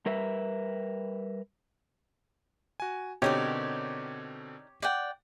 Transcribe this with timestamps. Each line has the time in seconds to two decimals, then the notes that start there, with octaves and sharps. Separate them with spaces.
0.06 G3 A#4 B4 E5
2.80 F#4 G#5
3.22 B2 D3 C4 D#4 G4 A#4 C#5 D5
4.82 D5 F#5 G5